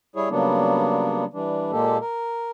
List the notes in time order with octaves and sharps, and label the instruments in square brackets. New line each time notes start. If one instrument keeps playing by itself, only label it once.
[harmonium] G3 E4 G#4 C#5
C#3 F#3 G3 A#3 B3 D4
E3 G3 D4
A#2 G#3 A#3 G4 A4
A#4